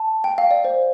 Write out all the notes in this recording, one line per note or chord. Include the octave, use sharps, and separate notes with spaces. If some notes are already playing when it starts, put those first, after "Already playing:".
Already playing: A5
G5
F5
D5
C5